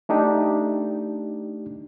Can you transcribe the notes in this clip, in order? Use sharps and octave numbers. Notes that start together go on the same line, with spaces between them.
A3 D4 D#4 G4